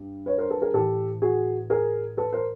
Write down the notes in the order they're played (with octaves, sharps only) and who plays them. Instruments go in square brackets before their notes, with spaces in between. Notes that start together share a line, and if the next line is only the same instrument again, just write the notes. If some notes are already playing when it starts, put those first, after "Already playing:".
Already playing: [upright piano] G2
B4 C#5
A#4 C5
A4 B4
G#4 A#4
A2 E3 G4 A4
F#4 G#4
G#4 A#4
A4 B4
A#4 C5